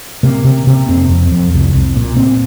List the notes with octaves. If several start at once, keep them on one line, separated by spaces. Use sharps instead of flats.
C3 A#3
C3
C3
F2 C4
F2
F2
C2
C2
A#2
A#2 C4